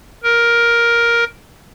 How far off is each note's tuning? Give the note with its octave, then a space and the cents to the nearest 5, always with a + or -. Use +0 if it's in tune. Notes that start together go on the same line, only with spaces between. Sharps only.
A#4 +10